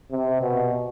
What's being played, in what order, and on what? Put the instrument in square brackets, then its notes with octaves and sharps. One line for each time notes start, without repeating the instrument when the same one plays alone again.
[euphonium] C3
B2